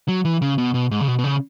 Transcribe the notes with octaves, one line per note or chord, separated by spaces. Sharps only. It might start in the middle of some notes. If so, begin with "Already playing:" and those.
F#3
E3
C#3
B2
B2
G#2
C#3
B2
B2
C#3